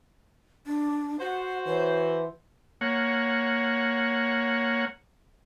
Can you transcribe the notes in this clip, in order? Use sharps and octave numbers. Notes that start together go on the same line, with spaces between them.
D4
F#4 C5 F#5
E3 C#5
A#3 C#5 F#5